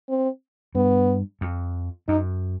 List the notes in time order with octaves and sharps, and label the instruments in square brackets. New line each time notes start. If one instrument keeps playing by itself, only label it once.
[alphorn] C4
[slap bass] G2 [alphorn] B3
[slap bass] F2
[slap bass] F#2 [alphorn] D#4